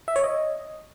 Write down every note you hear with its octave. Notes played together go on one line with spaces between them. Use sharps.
E5
C#5
D#5